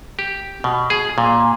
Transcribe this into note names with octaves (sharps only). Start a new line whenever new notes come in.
G4
B2
G#4
A#2